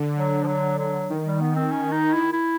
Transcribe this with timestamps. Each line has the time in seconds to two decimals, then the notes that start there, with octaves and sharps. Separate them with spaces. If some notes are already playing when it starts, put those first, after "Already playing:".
Already playing: D3
0.17 F#3
0.43 F3
0.48 F#3
0.78 F#3
1.10 D#3
1.25 G3
1.41 B3
1.56 C4
1.71 C#4
1.92 D#4
2.13 E4
2.33 E4